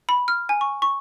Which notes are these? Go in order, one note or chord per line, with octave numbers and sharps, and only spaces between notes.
B5
F6
G#5
C#6
C#6